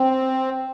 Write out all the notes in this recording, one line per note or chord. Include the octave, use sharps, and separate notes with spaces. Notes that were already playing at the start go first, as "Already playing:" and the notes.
Already playing: C4